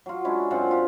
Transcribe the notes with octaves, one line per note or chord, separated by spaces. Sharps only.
F#3 F4
G#3 C#4 D4 E4
F#2 C4 F4 F#5
F4 G4